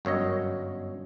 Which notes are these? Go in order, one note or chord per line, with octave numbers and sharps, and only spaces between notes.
G1 F#2 C#5 D#5